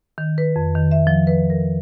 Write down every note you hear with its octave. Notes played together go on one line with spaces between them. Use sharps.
D#3
B4
F2
D#3
E5
F3
B4
A#4